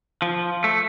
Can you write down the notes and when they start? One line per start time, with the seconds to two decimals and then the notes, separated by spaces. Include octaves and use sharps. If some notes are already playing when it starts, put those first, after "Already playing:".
0.22 F3
0.64 A3